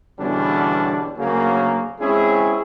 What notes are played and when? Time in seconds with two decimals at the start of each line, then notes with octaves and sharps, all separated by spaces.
0.19 E2 B2 D3 G3 C#4 D4
1.17 D2 C#3 F#3 A#3
2.00 G#3 C4 C#4 E4 G#4